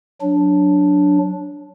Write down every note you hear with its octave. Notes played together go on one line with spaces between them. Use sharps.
F#3 D4